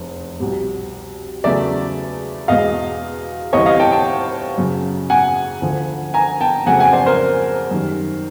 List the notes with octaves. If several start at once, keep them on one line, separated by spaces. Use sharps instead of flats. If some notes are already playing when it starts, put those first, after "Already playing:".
Already playing: F1 E2
C2 B2 G3
E2 C#3 F#3 A3 D5 E5
E2 B2 G#3 D#5 F5
D2 C3 E3 G3 C#5 D#5
D#5 F5
G5 A5
G5 A5
F#2 C#3 F#3
F#5 G#5
D2 D3 F3
G#5 A#5
G5 A5
F2 C#3 F#3 A3 F#5 G#5
F#5 G#5
C5 D5
A#4 C5
F#2 D#3 G3